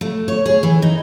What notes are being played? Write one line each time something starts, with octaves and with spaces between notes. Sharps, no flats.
A3
C#5
G#4
E3
D#4